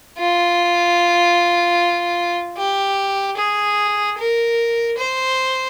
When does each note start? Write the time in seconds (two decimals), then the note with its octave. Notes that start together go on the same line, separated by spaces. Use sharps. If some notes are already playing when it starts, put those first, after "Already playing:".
0.19 F4
2.58 G4
3.37 G#4
4.18 A#4
4.97 C5